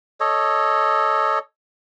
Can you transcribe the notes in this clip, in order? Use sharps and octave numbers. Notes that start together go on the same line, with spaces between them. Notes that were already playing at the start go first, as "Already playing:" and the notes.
A4 C#5 D#5